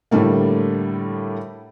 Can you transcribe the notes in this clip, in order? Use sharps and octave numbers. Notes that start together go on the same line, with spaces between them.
A2 D3 G3 A3 A#3